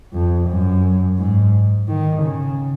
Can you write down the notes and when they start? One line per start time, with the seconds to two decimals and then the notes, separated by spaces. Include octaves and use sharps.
0.13 F2
0.49 F#2
1.18 G#2
1.88 D#3
2.23 C#3